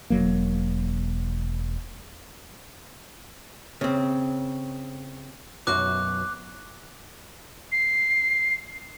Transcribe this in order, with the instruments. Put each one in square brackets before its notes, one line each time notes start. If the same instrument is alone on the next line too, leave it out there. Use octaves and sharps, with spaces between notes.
[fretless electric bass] E1 F#3 A#3
[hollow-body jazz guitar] C#3 C4
[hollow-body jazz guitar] B1 F#2 F#4 [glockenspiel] D6 F#6
[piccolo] C7